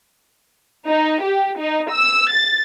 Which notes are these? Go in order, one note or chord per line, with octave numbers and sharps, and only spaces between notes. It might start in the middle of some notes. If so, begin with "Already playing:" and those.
D#4
G4
D#4
E6
A6